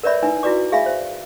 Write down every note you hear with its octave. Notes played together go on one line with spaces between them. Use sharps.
A#4 B4 C#5 D5 E5 B5
D#4 E4 B4 G#5
E4 F#4 B4 D5 D6
G#4 E5 F5 G#5 B5
C5